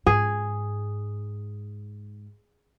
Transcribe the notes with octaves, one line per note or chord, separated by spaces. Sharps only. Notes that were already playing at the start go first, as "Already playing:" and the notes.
G#2 G#4